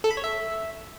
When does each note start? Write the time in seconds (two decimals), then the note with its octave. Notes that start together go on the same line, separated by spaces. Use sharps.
0.04 A4
0.11 B5
0.17 C#5
0.24 E5